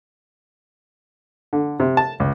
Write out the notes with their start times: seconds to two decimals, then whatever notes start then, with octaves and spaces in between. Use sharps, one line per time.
1.53 D3
1.80 C3
1.97 A5
2.20 C#2